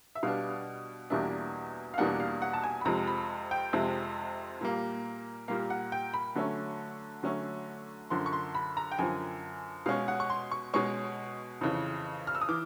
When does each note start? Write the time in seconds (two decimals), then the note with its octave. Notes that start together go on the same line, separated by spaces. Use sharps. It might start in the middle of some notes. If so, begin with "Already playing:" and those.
0.15 E5
0.23 B2 G3 B3 D4 F5
1.10 E2 B2 G3 A#3 D4 E5
1.94 F5
1.98 E2 B2 G3 A#3 D4 F#5
2.20 F5
2.42 F#5
2.53 A5
2.64 G#5
2.81 B5
2.85 F2 C3 F3 G#3 A#5
3.07 B5
3.51 G5
3.73 F2 C3 F3 G#3 E5
4.61 A#2 G3 A#3
5.48 A#2 G3 A#3 F5
5.70 F#5
5.92 G5
6.14 B5
6.35 D3 F#3 A3 C#4
7.23 D3 F#3 A3 C#4
8.10 F#2 D3 F3 C6
8.26 C#6
8.33 C6
8.55 B5
8.77 A#5
8.92 G5
8.99 F#2 D3 F3 G#5
9.86 B2 G#3 C#4 F5
10.08 F#5
10.20 C#6
10.30 C6
10.51 C#6
10.74 B2 G#3 C#4 C#6
11.61 F2 C#3 E3
12.27 F6
12.35 E6
12.41 D#6
12.49 E3 D6